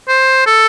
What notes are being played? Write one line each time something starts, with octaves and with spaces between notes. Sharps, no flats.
C5
A4